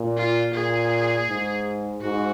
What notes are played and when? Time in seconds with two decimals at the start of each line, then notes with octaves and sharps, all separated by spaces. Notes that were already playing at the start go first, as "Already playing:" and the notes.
Already playing: A#2
0.17 F4
0.54 A#2 G#4
1.28 G#2
2.02 G#2 F#4